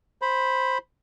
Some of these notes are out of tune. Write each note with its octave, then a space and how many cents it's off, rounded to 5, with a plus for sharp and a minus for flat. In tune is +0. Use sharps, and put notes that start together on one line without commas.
C5 +5 B5 +0